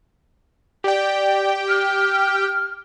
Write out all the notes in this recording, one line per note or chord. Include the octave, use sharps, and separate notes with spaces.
G4 D5 G5
F6